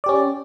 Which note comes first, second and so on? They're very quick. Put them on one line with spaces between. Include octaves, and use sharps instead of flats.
D5 G4 C#4